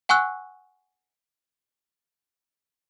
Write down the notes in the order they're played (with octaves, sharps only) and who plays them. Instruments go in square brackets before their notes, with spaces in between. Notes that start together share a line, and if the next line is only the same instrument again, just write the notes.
[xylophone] F#5 G#5 C#6 E6 F#6